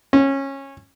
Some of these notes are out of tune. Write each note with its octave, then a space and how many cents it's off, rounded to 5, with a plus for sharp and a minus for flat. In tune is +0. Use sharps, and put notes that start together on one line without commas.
C#4 -20